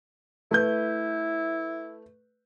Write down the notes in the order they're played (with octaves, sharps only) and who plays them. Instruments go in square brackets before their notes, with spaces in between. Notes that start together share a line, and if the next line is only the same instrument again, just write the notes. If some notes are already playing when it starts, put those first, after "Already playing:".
[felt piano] A3 B4 G6 [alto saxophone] E4